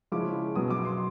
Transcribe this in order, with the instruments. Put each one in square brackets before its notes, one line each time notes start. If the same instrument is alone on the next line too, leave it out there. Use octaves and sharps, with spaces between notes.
[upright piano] C#3 F3 G#3 C#4 E4 D6
B2 F#3 B3 D#6
D6
C6